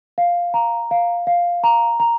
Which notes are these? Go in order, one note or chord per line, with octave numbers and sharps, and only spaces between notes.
F5
A#5
F5
F5
A#5
A#5